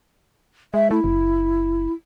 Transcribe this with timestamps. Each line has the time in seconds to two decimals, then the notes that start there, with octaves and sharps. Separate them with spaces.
0.74 G#3 E5
0.91 A3 E4
1.04 F#1